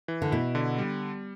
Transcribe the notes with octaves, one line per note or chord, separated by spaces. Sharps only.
E3
D3
B2 E4
D3
G3